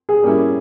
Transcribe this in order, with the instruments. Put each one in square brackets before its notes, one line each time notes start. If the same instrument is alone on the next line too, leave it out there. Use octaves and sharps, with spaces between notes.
[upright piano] G#4
[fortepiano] G3 A#3 C#4 E4